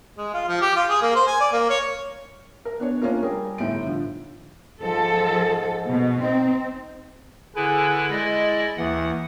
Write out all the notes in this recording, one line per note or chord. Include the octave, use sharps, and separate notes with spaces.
G#3
F4
F3
G4
F4
G#4
A#3
C5
G#5
D5
A#3
C#5
A#4
B3 D4 C#5
A#3 C#4 D4 F4 A#4
G3 G#4 A#4
G1 A2 D#4 E5 D7
D3 F3
G#2 F3 A4
B2
C4 D#4
D3 E4 G#4 B4
G#3 E4 D5 D#5
D#2 E3 F#5